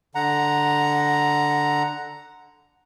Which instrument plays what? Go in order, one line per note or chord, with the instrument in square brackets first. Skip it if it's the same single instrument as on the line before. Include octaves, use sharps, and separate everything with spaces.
[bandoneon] D3 F#5 A#5